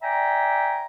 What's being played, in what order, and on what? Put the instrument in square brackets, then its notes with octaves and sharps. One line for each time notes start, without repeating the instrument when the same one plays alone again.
[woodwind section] D5 E5 G5 G#5 A#5